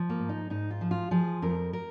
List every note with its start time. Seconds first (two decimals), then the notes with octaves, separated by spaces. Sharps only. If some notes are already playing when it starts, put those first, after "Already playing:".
Already playing: F3
0.09 A#3
0.19 G#2
0.29 D#4
0.50 G#2 D#4
0.70 F4
0.81 F3
0.91 F4
1.11 F3 G#4
1.42 F2 A#4
1.73 A#4